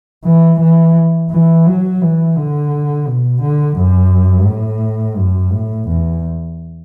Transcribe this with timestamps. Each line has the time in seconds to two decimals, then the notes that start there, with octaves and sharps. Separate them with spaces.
0.25 E3
0.60 E3
1.31 E3
1.66 F#3
2.02 E3
2.36 D3
3.07 B2
3.42 D3
3.77 F#2
4.48 A2
5.18 F#2
5.53 A2
5.89 E2